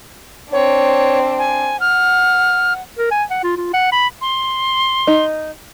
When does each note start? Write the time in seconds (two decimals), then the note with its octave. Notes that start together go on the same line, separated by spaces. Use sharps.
0.52 C4 D4 C#5
1.39 G#5
1.80 F#5 F6
2.98 A#4
3.11 G#5
3.30 F#5
3.44 F4
3.57 F4
3.74 F#5
3.92 B5
4.21 C6
5.07 D#4